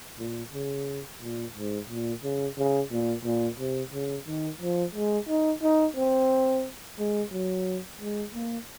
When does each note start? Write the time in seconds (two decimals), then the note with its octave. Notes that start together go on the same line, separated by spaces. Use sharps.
0.19 A#2
0.53 C#3
1.21 A#2
1.55 G#2
1.89 A#2
2.23 C#3
2.58 C#3
2.91 A#2
3.25 A#2
3.59 C3
3.93 C#3
4.27 D#3
4.61 F3
4.95 G#3
5.29 D#4
5.62 D#4
5.96 C4
6.99 G#3
7.32 F#3
8.01 G#3
8.34 A#3